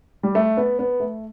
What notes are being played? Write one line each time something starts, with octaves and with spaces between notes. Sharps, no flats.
G3
A3
B3
B3
A3